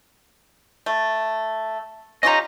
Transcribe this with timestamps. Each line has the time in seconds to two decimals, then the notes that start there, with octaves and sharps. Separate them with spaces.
0.86 A3
2.23 C#4 F4 G4 D#5 A#5